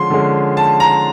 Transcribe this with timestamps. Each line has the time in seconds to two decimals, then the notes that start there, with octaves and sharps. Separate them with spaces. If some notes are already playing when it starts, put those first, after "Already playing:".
Already playing: D3 F3 G#3 C#4 C6
0.10 D3 F3 G#3 C#4
0.57 A5
0.80 A#5